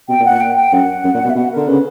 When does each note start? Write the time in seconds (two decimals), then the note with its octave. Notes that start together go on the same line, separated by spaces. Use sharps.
0.09 B2 G5
0.20 A#2
0.25 F#5
0.30 A#2
0.40 G5
0.56 G5
0.72 F#2 F#5
1.04 F#2
1.14 A#2
1.25 B2
1.30 E5
1.35 B2 F#5
1.52 D3 A#4
1.68 C#3 B4